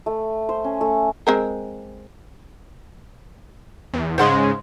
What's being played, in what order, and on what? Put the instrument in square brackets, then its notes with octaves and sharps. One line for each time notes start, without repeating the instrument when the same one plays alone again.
[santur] A3
C5
C#4
A3
[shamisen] G#3 C4 A#4
[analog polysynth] E2
[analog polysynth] G#2 C#3 G#3 [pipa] C5 F#5 C6